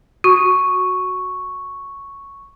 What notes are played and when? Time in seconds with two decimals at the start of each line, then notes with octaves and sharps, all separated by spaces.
0.24 F#4 C#6